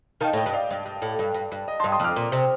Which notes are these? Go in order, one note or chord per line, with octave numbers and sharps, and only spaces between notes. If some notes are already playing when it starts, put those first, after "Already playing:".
D#3 F5 A5
A2 D#5 G5
G2
D5 F5
G2
G2
A2
G2
G2
G2
D#5
G2 A5 C6
C6 D#6
F2 D6 F6
A#2
C3